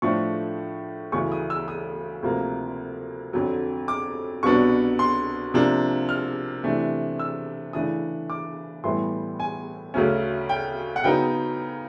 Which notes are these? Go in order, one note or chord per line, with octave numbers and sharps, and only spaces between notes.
A2 F3 A3 D4 C#6
D2 C#3 E3 A3 C#6
D#6
E6
D#6
D2 C3 F3 A#3
F2 D3 F#3
D6
C2 B2 F#3 B3 D4 C#6
C6
C3 F3 A#3 D4
F6
C3 E3 A3 D4
E6
C#3 E3 A3 D4 D#6
D6
A2 E3 G3 B3 E4 C6
G#5
D2 C#3 F#3 A3 C#4
G5
F#5
C#3 F#3 B3 D#4 G5